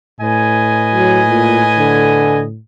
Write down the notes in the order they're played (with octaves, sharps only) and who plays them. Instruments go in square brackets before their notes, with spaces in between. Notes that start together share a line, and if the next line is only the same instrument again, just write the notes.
[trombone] A2 [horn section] B4 D#5 G#5
[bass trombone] F#3
A#2
D3